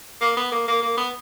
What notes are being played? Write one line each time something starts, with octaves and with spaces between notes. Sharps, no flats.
A#3
B3
A#3
A#3
A#3
B3